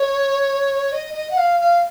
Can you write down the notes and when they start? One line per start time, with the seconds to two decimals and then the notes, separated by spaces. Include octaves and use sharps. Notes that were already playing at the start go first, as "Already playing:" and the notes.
Already playing: C#5
0.92 D#5
1.14 D#5
1.31 F#5
1.37 F5
1.60 F5